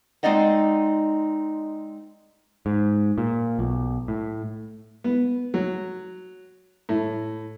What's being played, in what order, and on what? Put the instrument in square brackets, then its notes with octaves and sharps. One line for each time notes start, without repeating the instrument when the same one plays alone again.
[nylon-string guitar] G#3 C4 D#4 D5 D#5 F#5
[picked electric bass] G#2
A#2
B1
A2
[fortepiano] B3
F#3
A2